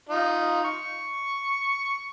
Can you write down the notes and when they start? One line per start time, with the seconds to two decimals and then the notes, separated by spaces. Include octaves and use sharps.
0.09 D#4 F4
0.64 C#6